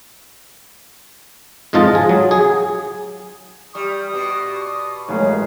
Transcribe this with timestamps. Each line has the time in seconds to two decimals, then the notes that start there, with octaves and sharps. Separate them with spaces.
1.73 F2 G#2 F3 F4 D#5 A5
1.95 G#4
2.09 F#3
2.31 G#4
3.75 G3 D5 C#6 D#6
4.14 B2
5.08 A1 F#2 G#3 F5